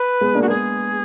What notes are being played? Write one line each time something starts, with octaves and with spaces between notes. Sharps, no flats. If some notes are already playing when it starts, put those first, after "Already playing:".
Already playing: B4
G#3 B3
A#3 D4
F#4
G#3 B3 G#4